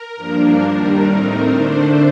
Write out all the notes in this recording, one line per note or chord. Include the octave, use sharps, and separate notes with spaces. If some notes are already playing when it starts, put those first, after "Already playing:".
Already playing: A#4
G2 F3 A#3 D4
D#2 D#3 G3 D4
A2 A3 C4 D#4
D3 A3 D4 C5